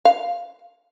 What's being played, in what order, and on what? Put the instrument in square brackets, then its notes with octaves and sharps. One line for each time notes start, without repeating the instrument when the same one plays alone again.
[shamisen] F5